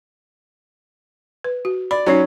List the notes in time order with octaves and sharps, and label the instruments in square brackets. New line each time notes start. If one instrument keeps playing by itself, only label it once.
[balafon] B4
F#4
[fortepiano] D5 [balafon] B5
[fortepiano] F#3 C#4 [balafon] D#4 C#5 D5